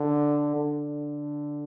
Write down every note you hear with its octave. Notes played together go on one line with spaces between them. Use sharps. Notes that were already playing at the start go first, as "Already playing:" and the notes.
Already playing: D3
D3